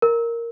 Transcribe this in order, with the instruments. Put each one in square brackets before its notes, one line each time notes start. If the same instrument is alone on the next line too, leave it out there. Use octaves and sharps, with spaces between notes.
[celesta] A#4